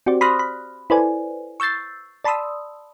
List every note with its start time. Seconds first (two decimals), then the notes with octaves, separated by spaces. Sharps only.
0.06 C4 F#4 G4 C5 D5
0.21 B5 C6 D#6 F6 F#6 A#6
0.39 B5
0.90 E4 A4 B4 C5 D5 G#5
1.60 C#6 E6 G6 A6 C7
2.24 D5 A5 B5 C6 D#6 E6